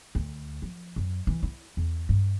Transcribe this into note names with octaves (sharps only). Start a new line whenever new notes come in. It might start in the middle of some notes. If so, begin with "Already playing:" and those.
D2
F3
F#2
E3
E4
E2
G2